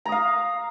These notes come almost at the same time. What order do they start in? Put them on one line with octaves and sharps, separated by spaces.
A#5 D#6 F5